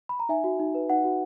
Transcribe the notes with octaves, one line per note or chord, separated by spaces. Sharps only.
B5
A#5
D#4 E5 G#5
F#4
D#4
B4
D#4 F#5
F#4